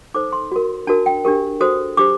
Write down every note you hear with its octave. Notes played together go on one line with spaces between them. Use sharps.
D#4 A4 C5 D6
C6
F#4 A#4
D4 F#4 A#4 A5
G5
D4 G4 A#4
F#4 A4 C5 D#6
D4 G4 C5 D6